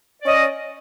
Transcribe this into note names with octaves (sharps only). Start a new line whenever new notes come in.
C#4 D5 D#5